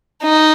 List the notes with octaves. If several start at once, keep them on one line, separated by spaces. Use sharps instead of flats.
D#4